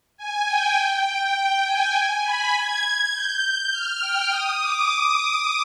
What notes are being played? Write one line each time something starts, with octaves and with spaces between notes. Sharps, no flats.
G#5
G5
G5
G5
G5
G#5
B5
G#6
G6
F6
G5
D#6
D6